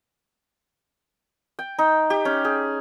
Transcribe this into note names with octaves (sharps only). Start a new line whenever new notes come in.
G5
D#4
G4
C#4
G#4